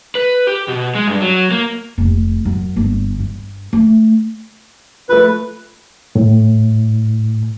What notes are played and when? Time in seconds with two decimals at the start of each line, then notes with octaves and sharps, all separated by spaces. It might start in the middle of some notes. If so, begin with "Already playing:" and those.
0.15 B4
0.47 G4
0.68 B2
0.95 G#3
1.07 G2
1.21 F#3
1.51 A#3
1.98 F1
2.45 F#2
2.76 G1
3.19 G2
3.73 A3
5.09 F3 A3 B4
6.15 A2